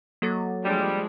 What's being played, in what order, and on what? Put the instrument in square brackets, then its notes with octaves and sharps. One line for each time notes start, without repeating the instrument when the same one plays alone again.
[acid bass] F#3 [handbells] A#3 A4 A6
[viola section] F3 G#3 D4 [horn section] G3